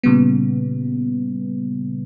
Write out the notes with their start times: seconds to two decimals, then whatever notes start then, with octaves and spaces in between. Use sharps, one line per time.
0.03 A#2 C#3 G3 B3